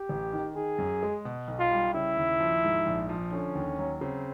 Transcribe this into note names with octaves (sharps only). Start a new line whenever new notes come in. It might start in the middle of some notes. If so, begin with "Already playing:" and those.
Already playing: G4
A1
D#3
D#3 G#4
F#2
G#3
B2
B1
F4
G3
C#3 E4
D#2
F3
G#2
A#1
F3
D3 C#4
D#2
F#3
C#3 C4